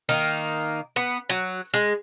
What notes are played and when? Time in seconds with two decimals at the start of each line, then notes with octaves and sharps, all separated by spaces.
0.09 D#3 A#3 D#4
0.96 B3
1.29 F#3
1.74 G#3